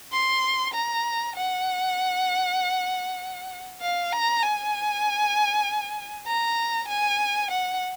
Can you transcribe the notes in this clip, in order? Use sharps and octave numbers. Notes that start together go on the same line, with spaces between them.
C6
A#5
F#5
F5
A#5
G#5
A#5
G#5
F#5